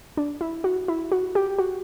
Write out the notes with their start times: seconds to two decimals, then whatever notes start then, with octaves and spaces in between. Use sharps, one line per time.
0.17 D4
0.41 E4
0.64 F#4
0.88 E4
1.12 F#4
1.35 G4
1.59 F#4